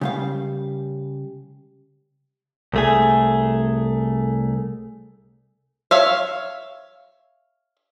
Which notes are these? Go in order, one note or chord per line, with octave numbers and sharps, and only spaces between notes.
C#3 G3 F5
C2 A3 G#4
C#5 E5 F5